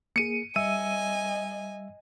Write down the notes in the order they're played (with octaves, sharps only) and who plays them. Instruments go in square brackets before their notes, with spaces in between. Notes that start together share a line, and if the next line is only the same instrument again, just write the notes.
[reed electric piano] A#3 G#4 [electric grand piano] C#7 D#7
[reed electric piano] G3 E5 E6 [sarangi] D#5 [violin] G#5 [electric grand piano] D#7